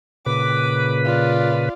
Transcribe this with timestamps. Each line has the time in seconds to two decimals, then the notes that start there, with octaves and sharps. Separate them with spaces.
0.26 A#2 C#3 B4 D6
1.05 F4 D5